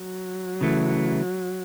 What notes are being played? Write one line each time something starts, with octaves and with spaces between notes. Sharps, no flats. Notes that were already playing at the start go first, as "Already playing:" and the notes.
Already playing: F#3
C#3 E3 A3